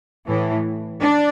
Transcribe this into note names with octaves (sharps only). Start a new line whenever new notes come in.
A2 E3
D4